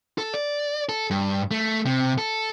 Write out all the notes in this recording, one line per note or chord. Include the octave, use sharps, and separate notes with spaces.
A4
D5
A4
G2
A3
C3
A4